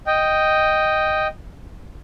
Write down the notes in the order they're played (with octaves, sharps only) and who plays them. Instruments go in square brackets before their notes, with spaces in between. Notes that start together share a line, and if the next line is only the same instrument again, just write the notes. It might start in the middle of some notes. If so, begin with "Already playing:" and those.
[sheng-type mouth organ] D#5 G5